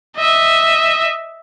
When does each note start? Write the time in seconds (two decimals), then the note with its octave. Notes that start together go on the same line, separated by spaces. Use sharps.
0.17 D#5 E5